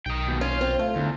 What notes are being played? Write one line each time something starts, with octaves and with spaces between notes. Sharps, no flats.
B1 D#5 G5
D#2 B2
C#4 F4
C4
A3 F4
E2 D3